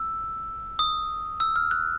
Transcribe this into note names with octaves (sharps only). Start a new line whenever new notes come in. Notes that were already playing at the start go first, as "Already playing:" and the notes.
Already playing: E6
D#6
E6
F6
F#6